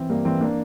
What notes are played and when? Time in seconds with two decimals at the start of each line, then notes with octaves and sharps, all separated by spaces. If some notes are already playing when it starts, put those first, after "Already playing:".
Already playing: E3 C4
0.09 G2 A#3
0.25 E3 C4
0.41 A#3 D4